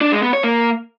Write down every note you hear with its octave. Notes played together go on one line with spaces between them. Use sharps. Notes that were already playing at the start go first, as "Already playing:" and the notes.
D4
G#3
B3
C#5
A#3